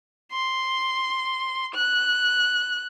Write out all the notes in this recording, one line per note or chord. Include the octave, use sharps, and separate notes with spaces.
C6
F#6